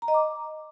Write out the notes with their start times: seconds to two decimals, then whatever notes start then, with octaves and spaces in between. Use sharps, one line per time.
0.02 A#5
0.08 D#5
0.14 D6